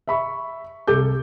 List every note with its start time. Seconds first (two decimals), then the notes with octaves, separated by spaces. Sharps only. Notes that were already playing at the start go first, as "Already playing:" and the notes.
0.08 E5 B5 C#6
0.88 C2 A4 D6 G6